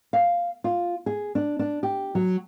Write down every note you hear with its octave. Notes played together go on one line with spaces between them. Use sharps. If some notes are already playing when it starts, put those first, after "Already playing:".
F5
F4
G#4
D4
D4
G4
F#3